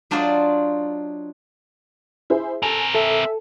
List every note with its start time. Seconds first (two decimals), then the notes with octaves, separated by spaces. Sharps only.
0.11 F#3 D4 F4 C5 D5 D#5
2.30 E4 G#4 C5
2.63 C4 A4 A#4 G#5 F7
2.95 A4 E5